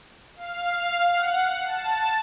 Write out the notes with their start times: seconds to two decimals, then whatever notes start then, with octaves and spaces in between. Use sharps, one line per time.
0.36 F5
1.12 F#5
1.65 A5